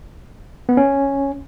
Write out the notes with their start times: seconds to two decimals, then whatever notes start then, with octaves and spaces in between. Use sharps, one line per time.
0.69 B3
0.77 C#4